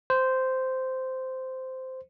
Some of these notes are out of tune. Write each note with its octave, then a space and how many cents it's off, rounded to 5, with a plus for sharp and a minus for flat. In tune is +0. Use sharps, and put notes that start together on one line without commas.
C5 -10